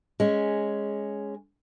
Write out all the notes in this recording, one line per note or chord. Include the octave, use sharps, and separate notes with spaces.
G#3 C#4